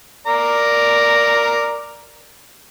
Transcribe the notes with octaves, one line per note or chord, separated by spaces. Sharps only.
A#4 D5 A#5